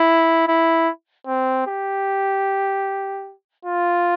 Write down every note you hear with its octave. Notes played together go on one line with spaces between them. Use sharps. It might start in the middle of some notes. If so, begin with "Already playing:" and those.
Already playing: E4
E4
C4
G4
F4